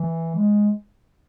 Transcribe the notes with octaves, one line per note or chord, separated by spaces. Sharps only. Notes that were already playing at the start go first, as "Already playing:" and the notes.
Already playing: E3
G#3